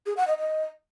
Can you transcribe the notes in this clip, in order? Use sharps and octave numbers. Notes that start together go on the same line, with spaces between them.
G#4
F#5
D#5
D#5